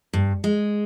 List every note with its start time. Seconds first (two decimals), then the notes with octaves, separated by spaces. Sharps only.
0.13 G2
0.44 G#3